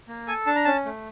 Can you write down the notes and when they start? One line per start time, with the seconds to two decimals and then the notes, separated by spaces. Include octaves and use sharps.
0.08 A#3
0.27 A4 G#5
0.46 D4 A5
0.55 A#5
0.65 C#4 A5
0.85 A3